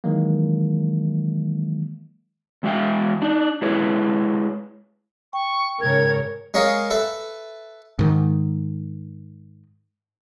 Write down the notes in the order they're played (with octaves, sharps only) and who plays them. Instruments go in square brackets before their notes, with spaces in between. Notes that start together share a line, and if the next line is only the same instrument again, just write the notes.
[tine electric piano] D#3 E3 F#3 G#3 A#3
[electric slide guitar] E2 G#3 F#4 E5 F5 G5
D4 D#4
G#3 E4 G#4 B4 C#5
[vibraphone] G5 [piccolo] C#6
[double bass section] G#2 C#3 [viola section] A#4 C#5 [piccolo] G#6
[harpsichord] G#3 C#4 G#4 A#4 C#5 F5
A4 B4 E5
[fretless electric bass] G#2 D#3